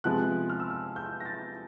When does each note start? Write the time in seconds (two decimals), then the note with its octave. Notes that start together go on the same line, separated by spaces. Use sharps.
0.04 C3 F3 G#3 B3 F#6
0.50 F6
0.60 E6
0.70 F6
0.96 G6
1.20 A#6
1.25 A6